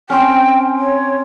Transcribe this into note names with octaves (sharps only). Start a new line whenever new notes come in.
C4 C#4 G5
C#5